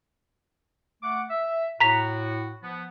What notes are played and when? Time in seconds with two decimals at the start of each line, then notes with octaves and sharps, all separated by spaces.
1.03 A3 F#5 D6
1.30 E5
1.80 A2 F#4 A#5 B6 F7
2.63 F3 B3